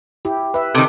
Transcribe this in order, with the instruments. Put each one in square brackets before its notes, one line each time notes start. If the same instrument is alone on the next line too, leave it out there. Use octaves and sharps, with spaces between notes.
[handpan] E4 G4
B4 E5
[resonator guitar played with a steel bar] C3 D#3 [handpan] A4